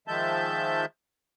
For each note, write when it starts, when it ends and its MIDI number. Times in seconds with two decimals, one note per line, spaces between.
0.08 0.85 51
0.08 0.85 53
0.08 0.85 56
0.08 0.85 76
0.08 0.85 81
0.08 0.85 91